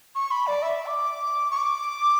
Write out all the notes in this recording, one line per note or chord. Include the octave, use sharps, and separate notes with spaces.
C#6
B5
D5
E5
D6
C#6
D6